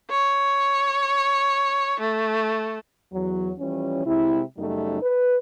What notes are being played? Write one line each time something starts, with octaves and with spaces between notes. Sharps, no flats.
C#5
A3
E2 F#3
E3 F3 G3 C#4
C3 G#3 E4
F#2 C#3 G3 A3 D#4
B4